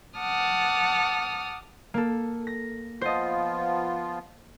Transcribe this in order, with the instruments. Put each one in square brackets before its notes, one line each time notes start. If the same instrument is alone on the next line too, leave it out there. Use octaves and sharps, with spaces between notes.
[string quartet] F#5 A5 D6 D#6 F6
[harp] A#3 A4
A#6
[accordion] F3 B3 F4 [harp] C5 D#5